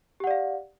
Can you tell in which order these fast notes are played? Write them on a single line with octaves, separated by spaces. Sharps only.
G4 F#5 D5 F5